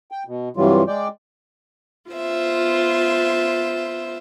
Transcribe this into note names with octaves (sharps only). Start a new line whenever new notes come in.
G5
B2
G2 C3 E3 F#3 G3 F4
G#3 D5 G5
B3 F4 C5 E5